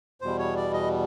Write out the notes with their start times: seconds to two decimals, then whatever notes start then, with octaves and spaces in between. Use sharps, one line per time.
0.21 E2 B2 G3 C5
0.39 C#5
0.56 D5
0.73 D#5